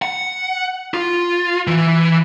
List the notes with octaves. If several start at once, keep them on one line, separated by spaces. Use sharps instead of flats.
F#5
F4
E3